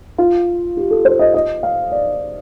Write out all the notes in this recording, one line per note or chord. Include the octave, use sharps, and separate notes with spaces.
F4
G4
A4
C5
D#5
D#5
F5
D5